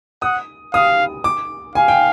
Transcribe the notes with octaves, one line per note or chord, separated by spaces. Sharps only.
F#5 D#6
F5 D#6
D6
F5 G#5
G5